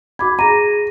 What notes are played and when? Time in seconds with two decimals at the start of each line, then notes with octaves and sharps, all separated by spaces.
0.19 F#4 B5 D6 G#6
0.39 G#4 A#5 A#6 D#7